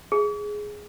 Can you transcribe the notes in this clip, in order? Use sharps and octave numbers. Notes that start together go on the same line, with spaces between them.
G#4